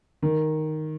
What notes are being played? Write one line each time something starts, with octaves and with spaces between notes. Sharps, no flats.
D#3